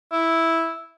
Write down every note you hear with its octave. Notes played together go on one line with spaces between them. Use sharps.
E4